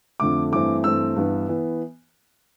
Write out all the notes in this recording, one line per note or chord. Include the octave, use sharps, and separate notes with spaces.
F2 D3 A3 D6
G2 E3 A3 C4 D6
G2 E3 A3 C4 E6
G2 E3 B3
E3 B3